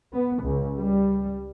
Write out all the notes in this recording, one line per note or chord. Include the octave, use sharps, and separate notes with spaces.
B3
C#2
G3